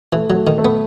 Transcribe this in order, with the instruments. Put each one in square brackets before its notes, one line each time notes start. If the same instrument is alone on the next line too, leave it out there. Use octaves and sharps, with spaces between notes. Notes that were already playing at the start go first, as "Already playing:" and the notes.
[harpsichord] E3 [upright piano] A3
[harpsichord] F#3
[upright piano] A3
[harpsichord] D#3
[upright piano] A3
[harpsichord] B3